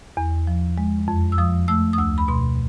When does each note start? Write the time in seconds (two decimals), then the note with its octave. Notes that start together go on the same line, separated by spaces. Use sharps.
0.17 E2
0.47 F3
0.78 G#3
1.08 F2
1.32 E6
1.38 F3 D#6
1.68 A3 E6
1.93 D#6
1.98 D2 E6
2.18 B5
2.28 B2 C6